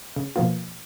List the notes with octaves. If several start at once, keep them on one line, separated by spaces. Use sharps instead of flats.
C#3
B2 F3 A#3 B3 F4